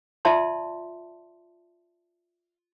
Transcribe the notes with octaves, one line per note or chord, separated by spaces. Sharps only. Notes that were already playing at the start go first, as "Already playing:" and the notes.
F4 D5 E5 A5 C6